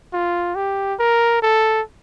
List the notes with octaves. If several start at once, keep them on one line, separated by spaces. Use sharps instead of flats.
F4
G4
A#4
A4